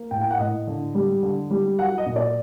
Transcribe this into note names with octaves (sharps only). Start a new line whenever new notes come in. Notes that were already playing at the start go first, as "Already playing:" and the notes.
Already playing: A#3
A2 G5
G5
F#5
A2 D#5
D3
G3
D3
G3
F#3 F#5
D#5
A#2
D5